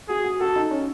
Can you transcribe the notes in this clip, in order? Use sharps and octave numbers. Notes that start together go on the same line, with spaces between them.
F#4 G#4
F#4
F#4 A4
D#4
C#4